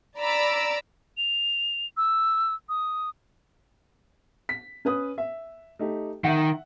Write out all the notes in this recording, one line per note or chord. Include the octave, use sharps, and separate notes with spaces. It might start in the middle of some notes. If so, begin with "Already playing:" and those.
D5 A#5 B5 D6 E6
F7
E6
D#6
B6
C#4 B4 D#6
E5
A3 D#4 G4
D#3 E5 F#5